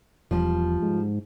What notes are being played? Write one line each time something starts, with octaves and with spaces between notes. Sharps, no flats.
E1 F3 G3
G#2